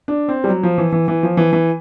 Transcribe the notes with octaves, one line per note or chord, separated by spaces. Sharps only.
D4
C4
G3
F#3
F3
E3
E3
E3
F3
E3
E3